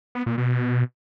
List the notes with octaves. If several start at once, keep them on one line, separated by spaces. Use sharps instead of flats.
B3
A#2
B2